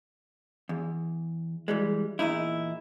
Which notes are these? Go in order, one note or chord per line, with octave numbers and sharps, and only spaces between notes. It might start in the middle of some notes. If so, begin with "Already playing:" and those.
E2
E3 G3 G#3
E2 A#2 D#4 E4